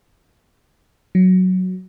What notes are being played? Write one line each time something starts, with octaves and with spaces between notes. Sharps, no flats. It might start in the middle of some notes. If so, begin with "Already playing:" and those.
F#3